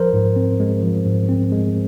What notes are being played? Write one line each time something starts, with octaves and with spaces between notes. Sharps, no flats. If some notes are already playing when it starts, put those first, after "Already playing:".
Already playing: F3 A#4 C5
G#2
C4
G#3
F3
G#2
C4
G#3